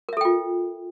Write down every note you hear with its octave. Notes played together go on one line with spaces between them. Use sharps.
F4 A4 A#4 E5 G5